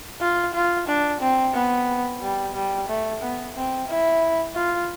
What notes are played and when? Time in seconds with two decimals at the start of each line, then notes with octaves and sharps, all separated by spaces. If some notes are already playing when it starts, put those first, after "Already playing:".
0.21 F4
0.54 F4
0.88 D4
1.21 C4
1.54 B3
2.21 G3
2.55 G3
2.89 A3
3.22 B3
3.55 C4
3.88 E4
4.55 F4